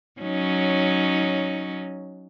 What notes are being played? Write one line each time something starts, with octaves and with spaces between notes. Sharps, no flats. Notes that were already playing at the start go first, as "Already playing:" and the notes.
F#3 C#4 D#4